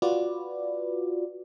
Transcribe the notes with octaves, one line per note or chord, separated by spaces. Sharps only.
F4 F#4 B4 D5